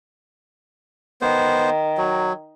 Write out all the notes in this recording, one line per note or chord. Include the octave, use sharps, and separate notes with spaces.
D#3 B3 C5
F#3